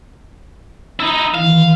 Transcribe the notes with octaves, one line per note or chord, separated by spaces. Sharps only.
D#4 E4
D#3 E3 F5